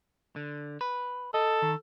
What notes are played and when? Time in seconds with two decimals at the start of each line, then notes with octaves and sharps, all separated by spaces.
0.36 D3
0.81 B4
1.34 A4 D#5
1.62 D#3